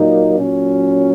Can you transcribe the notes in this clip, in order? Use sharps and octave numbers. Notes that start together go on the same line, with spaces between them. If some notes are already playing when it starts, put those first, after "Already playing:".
Already playing: A#2 F#3 A#3 D#4
A#2 F#3 C#4